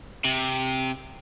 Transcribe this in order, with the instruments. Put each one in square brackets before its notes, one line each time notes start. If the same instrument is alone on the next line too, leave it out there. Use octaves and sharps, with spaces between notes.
[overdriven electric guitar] C3